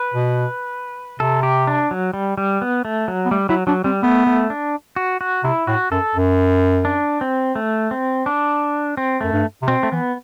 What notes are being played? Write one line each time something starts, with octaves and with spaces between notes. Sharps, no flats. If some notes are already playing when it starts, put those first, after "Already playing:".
Already playing: B4
B2
C3 A4
G4
D4
F#3
G3
G3
B3
A3
F#3
B3
G3 A3
F#3 E4
F#3 D4
G3 C4
A3 B3
A3
D4
F#4
F#4
C3 E4
A2 F#4
F#2 A4
F#2
D4
C4
A3
C4
D4
C4
F#2 A3
G2
C3
B2 C4
A3
E3 B3